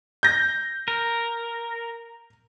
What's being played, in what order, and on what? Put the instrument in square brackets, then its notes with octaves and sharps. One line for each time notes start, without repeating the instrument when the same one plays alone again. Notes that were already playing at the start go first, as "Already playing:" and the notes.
[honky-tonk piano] G6 A#6
[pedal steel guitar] A#4